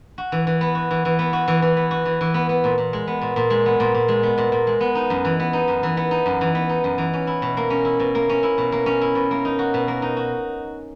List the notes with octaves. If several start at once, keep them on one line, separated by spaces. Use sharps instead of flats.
F#4
E3
E3
B3
F#4
E3
E3
B3
F#4
E3
E3
B3
F#4
E3
E3
B3
B3
A#2
A#2
G#3
B3
A#2
A#2
G#3
B3
A#2
A#2
G#3
B3
A#2
A#2
G#3
B3
D#4
F#2
E3
B3
D#4
F#2
E3
B3
D#4
F#2
E3
B3
D#4
F#2
E3
C#4
E4
B2
A#3
C#4
E4
B2
A#3
C#4
E4
B2
A#3
C#4
E4
B2
A#3
D#4
F#4
B2
A#3
D#4
F#4